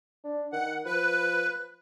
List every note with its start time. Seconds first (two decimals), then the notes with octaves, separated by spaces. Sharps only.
0.24 D4
0.52 D#3 F#5
0.85 F3 B4